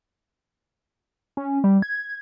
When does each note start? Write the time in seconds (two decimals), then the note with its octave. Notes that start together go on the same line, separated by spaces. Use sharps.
1.37 C#4
1.64 G3
1.82 G#6